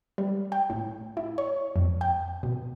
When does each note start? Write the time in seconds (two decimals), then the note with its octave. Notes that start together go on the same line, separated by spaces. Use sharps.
0.18 G3
0.52 G5
0.70 A2
1.17 E4
1.38 C#5
1.76 F2
2.01 G5
2.43 B2